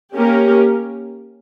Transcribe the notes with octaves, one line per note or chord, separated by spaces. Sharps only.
A#3 C#4 G4 A#4